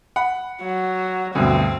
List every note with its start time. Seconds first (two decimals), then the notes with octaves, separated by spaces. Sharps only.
0.16 F#5 B5
0.63 F#3
1.35 D2 G2 B2 C4